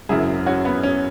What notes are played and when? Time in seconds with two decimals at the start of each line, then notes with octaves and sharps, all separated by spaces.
0.09 G#1 F#2 C#3 F#3 E4 G#4
0.46 C#4 F#4
0.65 B3
0.83 C#4